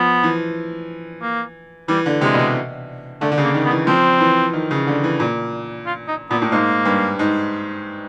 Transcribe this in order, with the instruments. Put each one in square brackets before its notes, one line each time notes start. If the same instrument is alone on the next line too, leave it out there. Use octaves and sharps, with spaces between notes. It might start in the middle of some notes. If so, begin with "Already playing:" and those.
Already playing: [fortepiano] F3 [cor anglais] B3
[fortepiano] E3
[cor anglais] A#3
[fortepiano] E3 [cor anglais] G3
[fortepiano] D3
[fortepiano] C3 [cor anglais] G#3
[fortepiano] B2
C3
[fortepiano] D3 [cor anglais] A3
[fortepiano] D3
C#3
[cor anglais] A#3
[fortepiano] D#3
[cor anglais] B3
[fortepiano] E3
[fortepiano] F3 [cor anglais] C4
[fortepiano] E3
D#3
C#3
D3
E3
A#2
[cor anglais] F4
D#4
[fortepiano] A#2 [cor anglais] B3
[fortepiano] A2
[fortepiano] G#2 [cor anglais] A#3
[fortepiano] G2
G#2